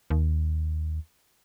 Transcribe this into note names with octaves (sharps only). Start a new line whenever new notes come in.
D#2